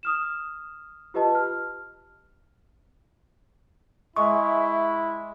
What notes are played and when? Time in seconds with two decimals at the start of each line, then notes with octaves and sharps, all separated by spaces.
0.03 D#6 F6 E7
1.14 F4 G4 B4 D#5 A5
1.35 F6
4.16 G#3 E4 E5 C#6